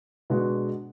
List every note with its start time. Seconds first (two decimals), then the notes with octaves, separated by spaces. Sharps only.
0.30 B2 G#3 D4 F#4